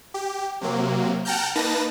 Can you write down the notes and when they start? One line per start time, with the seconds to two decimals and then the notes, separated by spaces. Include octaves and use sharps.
0.14 G4
0.61 C3 F#3 A#3
1.25 F#5 G5 A5 A#5 F6 G6
1.55 A#3 D#4 B4 A5 A#6